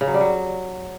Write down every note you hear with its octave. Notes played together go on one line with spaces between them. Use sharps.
C#3
F#3
G3
F#3